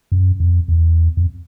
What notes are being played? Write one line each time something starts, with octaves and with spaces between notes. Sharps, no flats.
F#2
F2
E2
F2